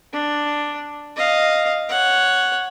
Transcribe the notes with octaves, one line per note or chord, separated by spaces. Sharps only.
D4
D#5 F5
C#5 F#5